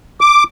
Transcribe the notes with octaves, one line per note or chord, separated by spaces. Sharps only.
D6